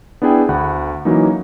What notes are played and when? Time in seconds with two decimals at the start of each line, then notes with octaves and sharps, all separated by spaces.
0.22 B3 D4 E4 G#4 G5 G#5
0.49 D2 F#5 B5
1.05 E3 F#3 A#3 C#4 D#4